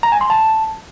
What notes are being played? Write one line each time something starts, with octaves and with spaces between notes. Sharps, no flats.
A#5
G#5
C6
A5